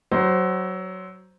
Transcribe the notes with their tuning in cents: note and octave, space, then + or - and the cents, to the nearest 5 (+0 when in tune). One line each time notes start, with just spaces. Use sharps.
F#3 +15 C5 +0